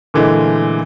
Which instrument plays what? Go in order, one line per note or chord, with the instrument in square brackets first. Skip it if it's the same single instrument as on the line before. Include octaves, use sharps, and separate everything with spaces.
[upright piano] A#2 D3 E3 G#3 A3